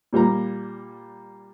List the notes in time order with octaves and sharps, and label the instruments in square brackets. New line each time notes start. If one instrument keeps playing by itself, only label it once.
[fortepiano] A#2 G3 A#3 A#5